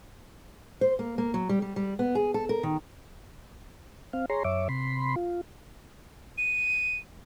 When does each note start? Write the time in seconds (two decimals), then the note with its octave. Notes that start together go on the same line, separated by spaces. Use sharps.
0.81 C5
0.99 A#3
1.18 A#3
1.34 F#3
1.49 G3
1.62 G3
1.76 G3
1.99 B3
2.15 G#4
2.34 A4
2.49 A#4
2.63 D#3
4.13 C4 F5
4.30 G#4 C#5 A#5 C6
4.44 F#2 C#5 E5 D6
4.69 C3 B5 C6
5.16 F4
6.38 D#7